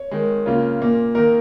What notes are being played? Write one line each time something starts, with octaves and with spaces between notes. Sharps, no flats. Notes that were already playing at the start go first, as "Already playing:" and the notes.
Already playing: C#5
D#3 G#3
C#3 A#3 F4
A#2 A#3
D#3 A#3 A#4